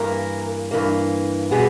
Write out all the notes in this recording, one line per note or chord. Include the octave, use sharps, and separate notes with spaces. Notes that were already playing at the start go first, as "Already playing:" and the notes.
Already playing: G2 E3 A#3 A#4
G2 E3 A#3
B2 G3 B3 G#4